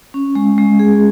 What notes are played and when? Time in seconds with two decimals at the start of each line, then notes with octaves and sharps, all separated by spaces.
0.14 C#4
0.35 G#3
0.58 G#3
0.79 G#4